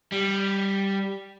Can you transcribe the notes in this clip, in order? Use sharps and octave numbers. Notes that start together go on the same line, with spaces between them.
G3